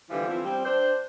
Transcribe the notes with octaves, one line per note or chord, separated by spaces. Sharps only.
D3 E3 F3 G3 B3 F4
E3 F3 C4 E4 F4
G3 C4
D4 C5